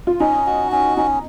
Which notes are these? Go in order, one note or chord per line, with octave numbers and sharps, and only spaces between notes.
F4
C#4 D#4
F#4
C#4
C#4 D#4